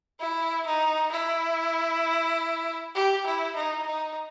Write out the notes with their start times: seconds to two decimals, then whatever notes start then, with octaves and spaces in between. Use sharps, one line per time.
0.20 E4
0.67 D#4
1.11 E4
2.95 G4
3.26 E4
3.56 D#4
3.87 D#4